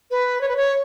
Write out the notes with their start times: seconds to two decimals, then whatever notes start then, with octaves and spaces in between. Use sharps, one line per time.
0.11 B4
0.41 C#5
0.49 B4
0.57 C#5